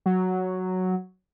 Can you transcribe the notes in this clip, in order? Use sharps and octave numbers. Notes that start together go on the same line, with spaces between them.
F#3